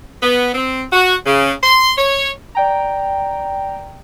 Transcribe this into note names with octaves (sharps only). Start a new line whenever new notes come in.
B3
C4
F#4
C#3
C6
C#5
D5 G5 A#5